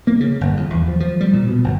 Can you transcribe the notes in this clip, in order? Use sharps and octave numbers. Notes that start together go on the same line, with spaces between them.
A#3
C#3
G1
F2
E2
F3
F3
G3
A#2
B2
G1